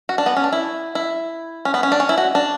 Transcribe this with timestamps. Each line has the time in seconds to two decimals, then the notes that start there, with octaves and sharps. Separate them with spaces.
0.09 F#4
0.18 D4
0.26 B3
0.37 C#4
0.44 D4
0.53 E4
0.95 E4
1.65 C#4
1.74 B3
1.83 C#4
1.92 D4
2.00 C#4
2.09 E4
2.18 F#4
2.35 D4